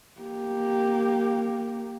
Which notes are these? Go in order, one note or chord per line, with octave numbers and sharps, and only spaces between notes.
A#3 G4